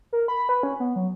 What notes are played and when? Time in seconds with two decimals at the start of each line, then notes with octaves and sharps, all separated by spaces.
0.13 A#4
0.28 B5
0.49 B4
0.63 C#4
0.80 B3
0.96 F#3